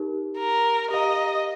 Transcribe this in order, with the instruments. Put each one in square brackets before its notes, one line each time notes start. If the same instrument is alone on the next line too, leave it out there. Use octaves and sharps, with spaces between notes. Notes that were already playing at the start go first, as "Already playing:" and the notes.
Already playing: [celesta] D#4 G4 A#4
[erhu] A#4
[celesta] G4 A#4 F5 A#5 [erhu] D#5